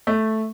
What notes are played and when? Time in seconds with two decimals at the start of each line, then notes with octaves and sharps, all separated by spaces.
0.07 A3